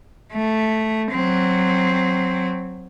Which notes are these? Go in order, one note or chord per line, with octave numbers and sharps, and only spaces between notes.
A3
F#3 C4